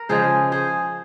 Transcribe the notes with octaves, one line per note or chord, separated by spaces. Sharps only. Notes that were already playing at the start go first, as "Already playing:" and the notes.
Already playing: A#4
C#3 F3 G#3 G#4 C5
G#4 C5